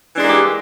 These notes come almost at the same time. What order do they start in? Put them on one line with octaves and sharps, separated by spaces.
E3 D4 G#3 A#3 G4